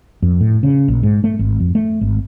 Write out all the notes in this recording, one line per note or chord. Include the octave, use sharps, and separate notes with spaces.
F2
A2
C#3
A#1
G#2
A3
G#1
F2
A3
G#1